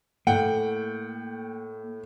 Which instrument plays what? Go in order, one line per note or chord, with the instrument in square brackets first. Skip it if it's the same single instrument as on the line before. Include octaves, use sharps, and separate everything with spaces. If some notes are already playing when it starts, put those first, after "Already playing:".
[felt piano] A2 [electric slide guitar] A#3 A4 [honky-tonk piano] F#5 G5